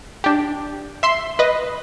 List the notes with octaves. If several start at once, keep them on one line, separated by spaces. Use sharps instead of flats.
D4 G4
E5 C6
B4 D#5